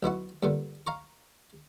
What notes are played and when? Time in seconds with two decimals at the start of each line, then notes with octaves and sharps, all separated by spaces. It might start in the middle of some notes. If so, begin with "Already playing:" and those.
0.03 B1 B2 E4 F#4
0.43 G2 A#2 D3
0.87 F5 A#5 C#6